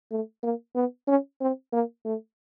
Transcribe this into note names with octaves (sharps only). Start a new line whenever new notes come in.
A3
A#3
B3
C#4
C4
A#3
A3